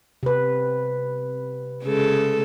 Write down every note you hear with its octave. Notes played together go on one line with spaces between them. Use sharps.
C3 B4
C#3 G#3 A4